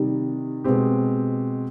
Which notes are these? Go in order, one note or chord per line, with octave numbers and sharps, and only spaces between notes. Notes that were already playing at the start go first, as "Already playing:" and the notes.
Already playing: C3 D#3 G3
B2 G#3 C4 G4